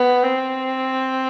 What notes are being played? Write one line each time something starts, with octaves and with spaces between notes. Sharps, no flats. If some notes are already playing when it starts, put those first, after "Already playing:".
Already playing: B3
C4